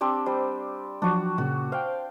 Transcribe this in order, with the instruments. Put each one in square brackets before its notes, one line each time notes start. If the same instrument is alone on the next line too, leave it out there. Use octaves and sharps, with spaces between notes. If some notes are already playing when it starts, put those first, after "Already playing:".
[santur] C4 D4 G4
[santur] G3 [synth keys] C5
[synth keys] F3 F#3 [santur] D4 F#4
[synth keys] A#2 C#3 [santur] F#4
[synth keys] C5 G5 [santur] F5